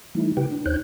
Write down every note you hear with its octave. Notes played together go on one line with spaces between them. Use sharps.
E3 G3 A3 D#4 E4
C#3 E4 G4 B4 G5
D4
D#2 D#4 C5 C#5 F#6 G6